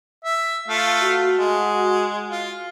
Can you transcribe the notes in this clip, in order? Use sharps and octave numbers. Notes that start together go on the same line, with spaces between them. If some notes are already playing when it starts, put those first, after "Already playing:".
E5
A3 F4 F5
F#4
G#3
F4